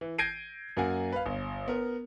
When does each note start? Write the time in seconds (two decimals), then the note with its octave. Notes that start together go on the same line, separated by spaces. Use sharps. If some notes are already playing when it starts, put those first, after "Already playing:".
0.01 E3
0.18 G6 G#6 A#6 C7 D7 D#7
0.77 F#2 A#3 A#4 F#5 G#5
1.12 B4 F5
1.26 G1
1.68 B3 A#4